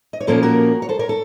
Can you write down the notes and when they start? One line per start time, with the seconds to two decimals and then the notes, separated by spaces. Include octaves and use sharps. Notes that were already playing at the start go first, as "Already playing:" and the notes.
0.13 D#5
0.21 C#5
0.27 A#2 F3 A#3 C#4 A4 C5
0.43 F#4 A#4
0.82 C#5
0.89 A4 C5
0.99 A#4 C#5
1.09 A4